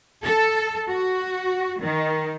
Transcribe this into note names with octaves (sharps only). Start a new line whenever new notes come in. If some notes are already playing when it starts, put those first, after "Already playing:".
A4
F#4
D#3